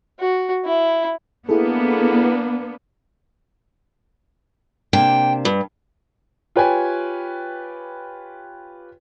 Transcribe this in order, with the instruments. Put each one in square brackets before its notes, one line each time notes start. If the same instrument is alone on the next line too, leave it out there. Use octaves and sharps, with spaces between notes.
[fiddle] F#4
E4
[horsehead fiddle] A#3 D4 [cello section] B3 [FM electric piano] E4 G#4 A4
[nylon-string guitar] C3 A#3 D4 [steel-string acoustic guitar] G5
[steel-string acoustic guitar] G2
[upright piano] F4 G4 B4 C#5 G5 G#5